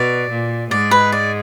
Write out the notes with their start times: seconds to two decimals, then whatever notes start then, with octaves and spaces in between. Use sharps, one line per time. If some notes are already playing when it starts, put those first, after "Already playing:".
Already playing: B2 D5
0.30 A#2
0.71 G#2 G#3 D5
0.91 B4
1.12 D5